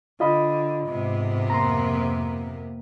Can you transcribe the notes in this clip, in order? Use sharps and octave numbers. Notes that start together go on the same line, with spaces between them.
D3 F4 D#5 B5
G#2 C3 B3
F2 A#3 A#5 C6